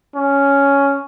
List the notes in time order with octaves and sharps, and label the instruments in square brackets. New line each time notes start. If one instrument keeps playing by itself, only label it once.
[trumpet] C#4